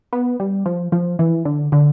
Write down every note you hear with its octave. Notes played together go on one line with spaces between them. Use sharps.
B3
G3
F3
F3
E3
D3
D3